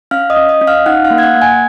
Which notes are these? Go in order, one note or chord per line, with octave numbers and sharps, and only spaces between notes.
C#4 F5 F6
D#5 D#6
C#4
D#5 D#6
C#4
F5 F6
D#4 F#5 F#6
F5 F6
A#3
G#6
F#5 F#6
A#3
G#5 G#6